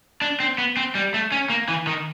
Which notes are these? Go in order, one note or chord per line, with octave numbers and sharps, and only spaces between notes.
D4
C4
B3
C4
G3
A3
C#4
A#3
E3
D#3